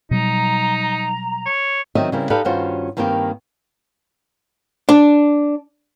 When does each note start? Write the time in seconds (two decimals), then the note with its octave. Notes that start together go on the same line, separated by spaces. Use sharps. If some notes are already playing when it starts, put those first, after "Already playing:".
0.11 B2 F#3 G3 D#4 A#5
1.46 C#5
1.95 D#3 F#3 C4 D#5 E5
2.12 C#3 G3 C4 E4 A#4
2.30 D#4 G4 A4 B4 D5 F5
2.45 G2 D#3 C#4 F4 F#4 C5
2.97 G2 D#3 A#3 C4 G4 G5
4.89 D4